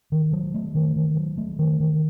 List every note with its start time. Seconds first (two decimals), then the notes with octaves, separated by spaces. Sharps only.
0.12 D#3
0.33 F#3
0.54 A3
0.75 D#3
0.96 D#3
1.17 F#3
1.38 A3
1.59 D#3
1.80 D#3